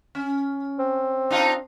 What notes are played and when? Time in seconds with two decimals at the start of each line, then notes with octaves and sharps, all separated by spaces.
0.15 C#4
0.79 C4
1.30 D4 D#4 F4